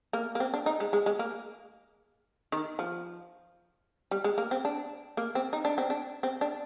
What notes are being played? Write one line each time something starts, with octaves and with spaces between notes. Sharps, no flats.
A#3
A#3
C4
D4
D#4
G#3
G#3
G#3
A#3
D#3
F3
G3
G#3
A#3
C4
D4
A#3
C4
D#4
D4
C4
D4
C4
D4